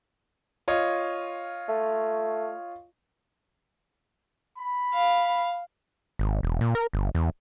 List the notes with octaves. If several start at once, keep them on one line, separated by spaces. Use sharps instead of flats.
F4 C#5 D#5
A3
B5
F5
G#1
E1
A#2
A#4
G1
E2